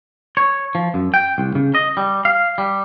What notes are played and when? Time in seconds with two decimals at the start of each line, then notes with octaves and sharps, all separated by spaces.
0.37 C#5
0.75 F3
0.94 F#2
1.14 G5
1.38 C2
1.55 C#3
1.75 D#5
1.97 G3
2.25 F5
2.58 G3